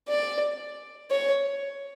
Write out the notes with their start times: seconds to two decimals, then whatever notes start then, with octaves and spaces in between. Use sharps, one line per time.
0.09 D5
1.10 C#5